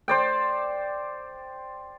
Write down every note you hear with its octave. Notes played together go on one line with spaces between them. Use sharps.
C5 D5 G5